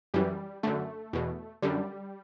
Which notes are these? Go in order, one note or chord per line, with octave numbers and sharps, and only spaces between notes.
F#2 E3 G3
F#2 D3 A3
E2 B2
F#2 D3 G3